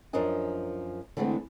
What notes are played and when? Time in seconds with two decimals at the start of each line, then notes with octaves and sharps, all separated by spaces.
0.13 F#2 F3 D4 A#4 D#5 G#5
1.17 D3 E3 G#3 A3 B3 C4